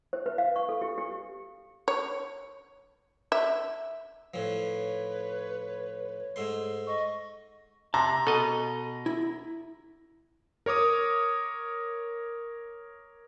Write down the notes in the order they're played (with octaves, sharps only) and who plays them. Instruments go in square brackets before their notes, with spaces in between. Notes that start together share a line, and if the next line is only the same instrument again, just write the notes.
[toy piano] C5
B4
F5
C#6
A4
G4
G4
[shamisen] C#5
E5
[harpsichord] A2 F3 [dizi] B4 [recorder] C#5
[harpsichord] G#2 A3 C6
[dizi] D#5 [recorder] C#6
[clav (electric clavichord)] C3 [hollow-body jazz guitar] A5 [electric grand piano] A#5
[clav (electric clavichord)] B2 D#5 [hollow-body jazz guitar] A4
[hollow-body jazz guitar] E4
[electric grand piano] A#4 C#5 D6 D#6